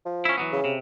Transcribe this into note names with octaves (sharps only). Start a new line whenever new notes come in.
F3
C#4 E4
E3 F#3 B3
C#3
C3